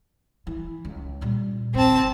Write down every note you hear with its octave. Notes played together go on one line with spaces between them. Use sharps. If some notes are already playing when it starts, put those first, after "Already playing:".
E3
C#2
A#2 G3
F#1 D#2 C4 A5